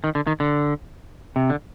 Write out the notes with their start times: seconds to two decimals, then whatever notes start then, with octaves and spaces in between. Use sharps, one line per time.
0.04 D#3
0.15 D3
0.27 D#3
0.40 D3
1.36 C3
1.50 D3